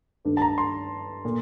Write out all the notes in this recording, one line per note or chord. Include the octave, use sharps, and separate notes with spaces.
G2 D#3 A3 D4
A5
A#5
C6
A#2 A3